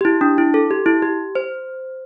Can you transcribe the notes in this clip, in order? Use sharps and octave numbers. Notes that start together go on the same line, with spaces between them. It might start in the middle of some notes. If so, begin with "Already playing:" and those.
G4
E4
D4
E4
A4
G4
E4
G4
C5